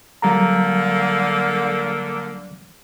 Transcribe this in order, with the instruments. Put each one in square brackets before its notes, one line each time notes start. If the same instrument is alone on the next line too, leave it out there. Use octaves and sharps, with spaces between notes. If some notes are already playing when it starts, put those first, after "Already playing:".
[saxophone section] D3 A#3 [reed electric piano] F#3 G3 A#5